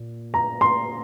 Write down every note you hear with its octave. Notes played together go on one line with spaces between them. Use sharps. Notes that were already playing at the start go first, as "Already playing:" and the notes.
Already playing: A#2
A#5
C6